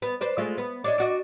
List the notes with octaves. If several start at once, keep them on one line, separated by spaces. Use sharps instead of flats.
B3
D4 B4 C5
G#3 A3 F4
B3
D4 C#5 D#5
D4 F#4 D#5